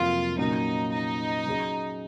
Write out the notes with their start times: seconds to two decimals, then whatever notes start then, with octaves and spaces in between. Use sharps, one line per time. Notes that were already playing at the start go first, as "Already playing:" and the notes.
Already playing: F2 C3 F#3 A#3 F4
0.38 A#2 F#3 A#3 C#4 D#4
0.92 D#4
1.47 F#3 C#4 G#4 D#5